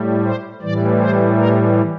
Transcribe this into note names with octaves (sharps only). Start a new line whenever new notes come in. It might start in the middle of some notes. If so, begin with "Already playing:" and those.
Already playing: A2 G3
C5
A2 E3 G3 D5
C5
A#4